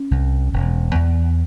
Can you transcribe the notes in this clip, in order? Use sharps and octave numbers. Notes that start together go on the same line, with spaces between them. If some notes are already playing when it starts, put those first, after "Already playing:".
Already playing: C#4
C2
E1
E2